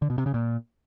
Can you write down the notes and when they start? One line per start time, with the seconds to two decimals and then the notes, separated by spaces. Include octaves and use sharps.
0.02 D3
0.10 B2
0.18 C3
0.26 C#3
0.34 A#2